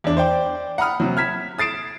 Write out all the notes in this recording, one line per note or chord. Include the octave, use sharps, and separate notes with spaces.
E2 D4
C5 D5 G5
F#5 A#5 B5 D#6 F6
C3 F#3
F6 G#6 B6 E7
D#6 A6 C7 D7 E7